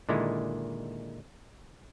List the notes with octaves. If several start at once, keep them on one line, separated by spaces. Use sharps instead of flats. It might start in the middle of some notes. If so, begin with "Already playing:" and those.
A#2 D3 D#3 G#3 E4